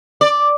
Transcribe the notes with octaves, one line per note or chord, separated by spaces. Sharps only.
D5